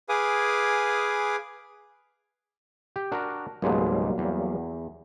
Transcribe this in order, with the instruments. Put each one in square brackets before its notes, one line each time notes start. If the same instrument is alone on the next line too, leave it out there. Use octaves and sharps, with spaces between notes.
[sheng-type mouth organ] G#4 B4 F5 G#5 D6 D#6
[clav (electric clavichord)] G4
D4 F#4 A#4
[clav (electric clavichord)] C#2 G#2 B2 [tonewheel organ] F#3 G3 A#3
[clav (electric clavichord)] E2